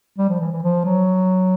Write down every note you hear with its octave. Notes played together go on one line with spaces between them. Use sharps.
G3
F3
E3
E3
F3
F#3